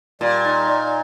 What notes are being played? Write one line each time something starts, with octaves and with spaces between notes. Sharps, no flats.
A#2 G3
D#4